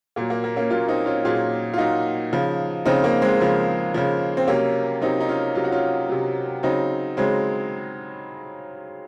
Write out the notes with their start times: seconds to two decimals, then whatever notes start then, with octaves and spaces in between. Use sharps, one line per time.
0.16 A#2 F#3 A#3
0.30 A#3
0.44 A#3
0.56 A#3 C#4
0.70 A#2 F#3 C#4 F4
0.88 C4 D#4
1.06 C#4 F4
1.25 A#2 F#3 F4 G#4
1.74 F4
1.78 A#2 F#3 D#4 F#4
2.33 C#3 F3
2.85 C#3 F3 C4 D#4
3.04 A#3
3.22 G#3 C4
3.40 C#3 F3
3.94 C#3 F3
4.37 C4
4.47 C3 F#3 A#3 C#4
5.01 C3 F#3 C4 D#4
5.20 D#4
5.29 C#4 F4
5.55 C3 F#3 F4
5.64 F#4
5.72 C#4 F4
6.09 C3 F#3
6.63 C#3 F#3 C4 D#4
7.17 C#3 F#3 G#3 C4